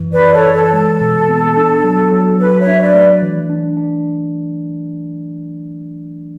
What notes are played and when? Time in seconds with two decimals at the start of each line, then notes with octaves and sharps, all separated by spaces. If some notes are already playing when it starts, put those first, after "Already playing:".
Already playing: F#2 E3
0.12 B4 D5
0.19 E4
0.32 A4 C#5
0.47 E3
0.53 A4
0.73 G#3 A4
1.01 B2
1.29 B3
1.57 D4
1.84 F#3
2.12 F#3
2.39 F#3 B4
2.60 C#5 E5
2.67 D4
2.81 B4 D5
2.94 A3
3.22 E3
3.50 D4
3.77 D4